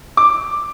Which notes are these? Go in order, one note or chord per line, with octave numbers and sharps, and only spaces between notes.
D6